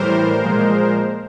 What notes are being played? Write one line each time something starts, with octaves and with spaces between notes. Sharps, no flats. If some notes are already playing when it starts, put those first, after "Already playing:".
Already playing: A2 E3 G3 A#4 C5
A#2 F3 G#3